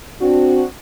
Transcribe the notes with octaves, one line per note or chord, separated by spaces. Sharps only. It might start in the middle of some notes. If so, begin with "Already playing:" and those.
C4 D4 F#4